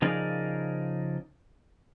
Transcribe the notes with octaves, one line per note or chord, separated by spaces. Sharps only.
C#3 F3 D#4 G#4 A#4 D5